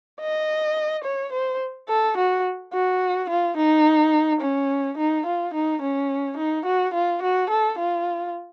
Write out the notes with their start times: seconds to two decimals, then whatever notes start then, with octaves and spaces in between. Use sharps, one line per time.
0.21 D#5
1.04 C#5
1.33 C5
1.88 A4
2.17 F#4
2.73 F#4
3.30 F4
3.57 D#4
4.41 C#4
4.98 D#4
5.26 F4
5.54 D#4
5.82 C#4
6.37 D#4
6.66 F#4
6.94 F4
7.23 F#4
7.50 A4
7.79 F4